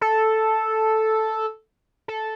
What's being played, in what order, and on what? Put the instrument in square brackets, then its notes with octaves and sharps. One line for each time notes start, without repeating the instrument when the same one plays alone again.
[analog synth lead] A4
A4